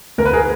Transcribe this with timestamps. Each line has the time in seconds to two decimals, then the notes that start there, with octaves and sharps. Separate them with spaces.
0.18 D2 A#4
0.25 B4
0.33 G#4 A#4